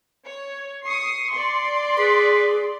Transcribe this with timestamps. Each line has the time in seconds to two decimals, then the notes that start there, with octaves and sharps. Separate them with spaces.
0.27 C#5
0.84 C#6 D#6 C7
1.34 D5 C6
1.98 G#4 B4